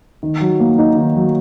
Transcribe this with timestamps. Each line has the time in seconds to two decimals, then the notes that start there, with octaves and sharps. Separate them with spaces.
0.23 D#3
0.41 F#3
0.60 A#3
0.78 D#4
0.97 D#3
1.15 F#3